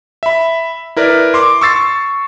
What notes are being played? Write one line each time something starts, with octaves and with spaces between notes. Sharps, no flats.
E5 B5
E4 A#4 B4 D5
C6 D6
C#6 E6 A6 C7